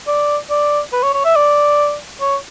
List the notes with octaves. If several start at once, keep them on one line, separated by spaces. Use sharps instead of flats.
D5
D5
B4
C#5
C#5
E5
D5
C#5